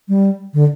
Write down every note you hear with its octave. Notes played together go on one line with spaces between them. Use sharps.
G3
D3